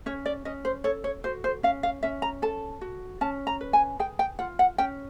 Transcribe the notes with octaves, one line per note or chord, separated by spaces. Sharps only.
C#4 C#5
D5
C#4 D#5
C5
A4 C#5
C#5
F#4 C5
C5
C#4 F5
F5
C#4 E5
A#5
A4 A5
F#4
C#4 A5
A#5
B4
G#5
G#4 G5
G5
F4 F#5
F#5
C#4 G5